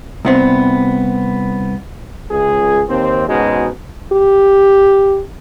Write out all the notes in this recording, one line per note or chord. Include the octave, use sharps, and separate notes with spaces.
C2 B3 C4
C#2 G#4
D#2 C4
G#2 B2 G#3 C#4 D#4 F#4
G4